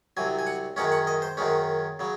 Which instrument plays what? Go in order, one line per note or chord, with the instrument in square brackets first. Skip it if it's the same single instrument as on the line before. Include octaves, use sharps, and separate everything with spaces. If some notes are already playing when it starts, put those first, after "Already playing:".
[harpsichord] C2 C3 F#3 G#5
G#5
F#5
F#2 D#3 G#3 C#4 F#5
F#5
D#5
C5
F#2 D#3 G#3 C#4
C#3 F#3